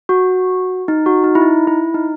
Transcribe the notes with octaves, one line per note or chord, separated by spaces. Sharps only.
F#4
D#4
F#4
D#4
E4
D#4
E4
D#4